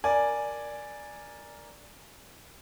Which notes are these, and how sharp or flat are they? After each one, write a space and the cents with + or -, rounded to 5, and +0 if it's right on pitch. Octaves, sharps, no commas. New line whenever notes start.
A#4 +0 D5 +0 G#5 +0